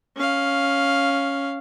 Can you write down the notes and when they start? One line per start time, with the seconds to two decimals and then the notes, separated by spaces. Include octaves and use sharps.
0.16 C#4 F5